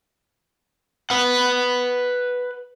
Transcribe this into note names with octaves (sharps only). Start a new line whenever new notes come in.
B4 F#5